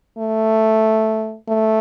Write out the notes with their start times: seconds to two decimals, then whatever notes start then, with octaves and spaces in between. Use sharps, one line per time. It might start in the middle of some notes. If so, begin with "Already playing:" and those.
0.18 A3
1.48 A3